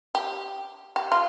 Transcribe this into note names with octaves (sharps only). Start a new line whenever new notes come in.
G4
G4
F4